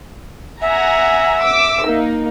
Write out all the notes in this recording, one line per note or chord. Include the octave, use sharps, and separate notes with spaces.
E5 F#5 G#5 A#5
D6 E6
A#3 D#4